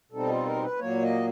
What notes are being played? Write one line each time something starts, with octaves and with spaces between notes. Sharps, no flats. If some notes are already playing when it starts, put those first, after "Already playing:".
B2 G3 C4 D#4 A4
F4
A#4
C5
B4
A#2 F#3 A#3 C#5
D#5